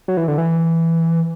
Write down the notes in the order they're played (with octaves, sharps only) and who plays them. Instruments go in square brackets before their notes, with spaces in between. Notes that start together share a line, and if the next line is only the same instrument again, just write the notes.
[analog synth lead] F#3
E3
D3
E3